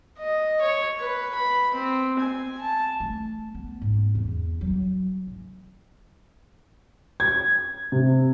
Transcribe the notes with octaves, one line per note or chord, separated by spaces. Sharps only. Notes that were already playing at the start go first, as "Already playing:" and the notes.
D#5
C#5
B4
B5
C4
G#5
A5
A3
B3
G#2
E2
F#3
G#2
G#6
C3